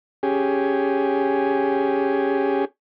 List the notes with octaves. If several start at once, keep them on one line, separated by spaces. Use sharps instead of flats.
C#4 G4 G#4